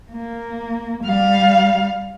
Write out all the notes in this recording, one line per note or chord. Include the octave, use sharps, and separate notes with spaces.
A#3
G3 F5